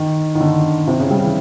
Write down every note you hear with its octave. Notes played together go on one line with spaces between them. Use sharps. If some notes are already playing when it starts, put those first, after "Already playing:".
Already playing: D#3
D#3
D3
C3
C#3
G3
E3